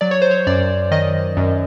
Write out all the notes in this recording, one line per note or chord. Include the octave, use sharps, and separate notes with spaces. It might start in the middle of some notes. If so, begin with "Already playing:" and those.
F#3 D5
C#5
C5
C#5
F#2 D5
D#3 D#5
F#2